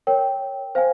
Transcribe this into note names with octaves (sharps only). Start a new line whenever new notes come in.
A#4 C#5 G5
C5 F5 G#5